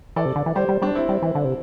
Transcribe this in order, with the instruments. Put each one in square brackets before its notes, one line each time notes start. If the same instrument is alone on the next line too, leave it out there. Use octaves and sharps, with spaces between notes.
[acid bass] E3 [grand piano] A4 D5
[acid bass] C3
D3
E3
[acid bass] G3 [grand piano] G4 C5
[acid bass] G3
[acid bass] G3 [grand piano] D4
[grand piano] C4 E4
[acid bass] G3
E3
D3
C3